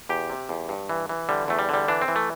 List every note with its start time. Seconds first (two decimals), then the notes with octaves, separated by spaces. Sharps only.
0.09 E2 G4
0.30 C3
0.49 E2
0.69 G2
0.89 E3
1.09 E3
1.29 D3 G3
1.48 E2 A3
1.59 G3
1.69 D3 G3
1.88 E3 D4
2.02 C4
2.08 E3
2.16 A3